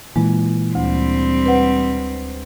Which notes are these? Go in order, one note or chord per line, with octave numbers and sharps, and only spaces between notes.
A#2 E3 G#3
D2 G3 C4
B4 C5 F#5